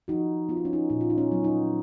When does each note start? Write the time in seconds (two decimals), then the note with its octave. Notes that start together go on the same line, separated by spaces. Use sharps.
0.08 F3 D#4 F#4
0.49 B3 F4
0.57 D#4
0.65 C#4
0.73 D#4
0.90 A#2 D#4
1.01 F4
1.10 D#4
1.18 C#4
1.31 F#3 B3
1.44 D#4